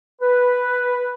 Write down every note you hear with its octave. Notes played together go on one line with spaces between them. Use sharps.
B4